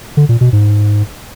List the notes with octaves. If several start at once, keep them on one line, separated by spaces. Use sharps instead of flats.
D3
A#2
B2
G#2